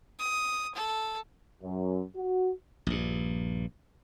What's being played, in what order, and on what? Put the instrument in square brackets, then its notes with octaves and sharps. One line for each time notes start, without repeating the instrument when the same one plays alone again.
[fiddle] D#6
A4
[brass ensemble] F#2
F#4
[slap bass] A#1 G2